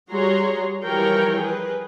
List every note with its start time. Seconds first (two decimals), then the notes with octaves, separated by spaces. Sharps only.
0.11 G3 F#4 G#4 C#5 A#5 C6
0.84 E3 F3 G3 A#4 C#5 G5
1.39 G#4 B4